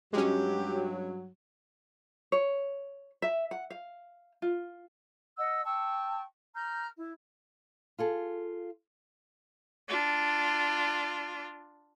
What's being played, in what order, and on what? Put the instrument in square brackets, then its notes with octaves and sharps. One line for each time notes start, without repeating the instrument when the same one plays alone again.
[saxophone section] G2 F#3 [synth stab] G#3 C#4 [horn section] G4
[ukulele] C#5
E5
F#5
F5
F4
[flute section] D#5 F#5 E6
G5 A5 C#6 E6
A#5 F6 G6
E4
[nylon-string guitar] F4 G#4 A4
[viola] D4 F4